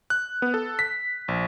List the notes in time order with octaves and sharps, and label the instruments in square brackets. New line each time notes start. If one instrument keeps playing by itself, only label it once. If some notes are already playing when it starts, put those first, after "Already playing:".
[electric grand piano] F#6
B3
A4
B6
A#1